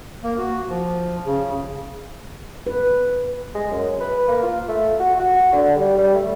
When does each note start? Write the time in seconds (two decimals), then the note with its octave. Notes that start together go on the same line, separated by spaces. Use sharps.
0.23 A#3
0.38 F#4
0.69 F3
1.25 C#3
2.67 B4
3.55 G#3
3.71 F#2
4.00 B4
4.28 A#3
4.43 F4
4.68 A3
5.00 F#4
5.19 F#4
5.52 D3
5.76 G3
5.98 G3
6.15 A3